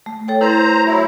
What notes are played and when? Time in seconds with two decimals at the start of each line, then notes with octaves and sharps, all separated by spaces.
0.06 A3
0.28 A4 C#5 G5
0.41 E4 B4 C5 A#5
0.85 F#3 E4